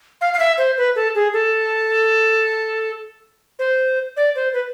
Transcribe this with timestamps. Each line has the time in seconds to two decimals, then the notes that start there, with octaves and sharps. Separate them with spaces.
0.21 F5
0.34 F5
0.39 E5
0.58 C5
0.78 B4
0.96 A4
1.15 G#4
1.33 A4
3.59 C5
4.17 D5
4.35 C5
4.53 B4